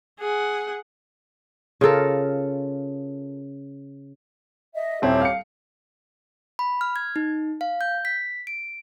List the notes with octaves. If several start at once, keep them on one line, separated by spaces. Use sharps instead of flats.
G#4 F#5
C#3 F4 A4 A#4
D#5 E5
D#1 C4 E4 G4 C#5
F5 C#7
B5
F6
G#6
D#4
F5
G6
B6
D7